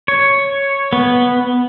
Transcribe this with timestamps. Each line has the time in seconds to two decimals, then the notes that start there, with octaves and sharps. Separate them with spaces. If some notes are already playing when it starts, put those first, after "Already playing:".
0.08 C#5
0.93 B3